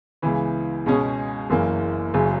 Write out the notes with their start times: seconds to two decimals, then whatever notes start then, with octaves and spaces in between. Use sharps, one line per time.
0.22 C#2 C#3 E3 B3
0.86 C#2 B2 G#3 C#4 G#4
1.50 F#1 F#2 E3 A#3
2.14 F#1 F#2 C#3 F#3